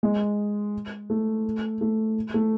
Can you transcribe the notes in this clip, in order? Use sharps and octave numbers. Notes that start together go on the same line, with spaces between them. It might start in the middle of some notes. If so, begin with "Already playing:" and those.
G#3
A3
A3
A3